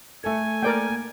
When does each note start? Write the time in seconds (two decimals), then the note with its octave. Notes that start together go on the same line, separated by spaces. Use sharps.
0.24 A3 A4 G#5
0.63 A#3 A#4 D5 G5